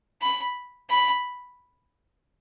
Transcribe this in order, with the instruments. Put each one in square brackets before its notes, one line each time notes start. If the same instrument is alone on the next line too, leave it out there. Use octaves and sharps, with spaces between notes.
[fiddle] B5
B5